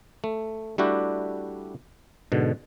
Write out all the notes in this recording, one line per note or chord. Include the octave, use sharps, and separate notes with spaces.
A3
G3 A3 D4 E4 F#4 G4
G#2 B2 D3